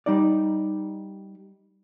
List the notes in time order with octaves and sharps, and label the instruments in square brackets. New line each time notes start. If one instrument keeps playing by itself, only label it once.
[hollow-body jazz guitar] G3 D#4 D5